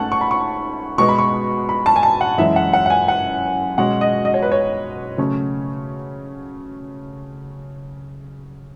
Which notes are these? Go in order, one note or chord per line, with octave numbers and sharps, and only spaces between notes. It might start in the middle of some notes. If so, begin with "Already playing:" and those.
Already playing: G#2 A3 C#4 F#5 A5
C#6
B5
C#6
B2 G#3 B3 C#6
B5
C#6
B5
A5
G#5
A5
F#5
F#2 E3 G#3 E5
F#5
F#5
F#5
G#5
F#5
B2 G#3 C#4 F#5
D#5
D#5
C#5
B4
C#5
C#3 F#3 A3 C#4